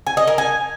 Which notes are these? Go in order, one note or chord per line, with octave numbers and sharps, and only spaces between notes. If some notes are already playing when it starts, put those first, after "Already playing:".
G#5
D#5
A#4
G#5